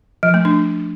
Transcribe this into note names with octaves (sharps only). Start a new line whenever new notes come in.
F3
A3
D4